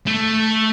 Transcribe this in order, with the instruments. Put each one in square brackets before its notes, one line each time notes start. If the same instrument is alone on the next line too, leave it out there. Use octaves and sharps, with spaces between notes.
[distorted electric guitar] A3